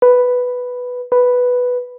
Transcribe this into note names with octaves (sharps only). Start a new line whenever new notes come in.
B4
B4